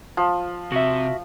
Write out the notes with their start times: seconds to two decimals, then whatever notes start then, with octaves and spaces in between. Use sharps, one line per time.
0.17 F3
0.72 C3 F#4 E5